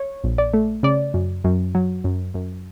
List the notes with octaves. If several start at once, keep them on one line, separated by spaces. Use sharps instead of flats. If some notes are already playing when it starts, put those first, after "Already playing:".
Already playing: C#5
A#1
D5
A3
C#3 D5
F#2
F#2
F#3
F#2
F#2